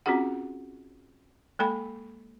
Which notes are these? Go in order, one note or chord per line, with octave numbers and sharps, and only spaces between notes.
C4 C#4 F4 F#4 G#4 F#5
G#3 A#3 A4 G5 B5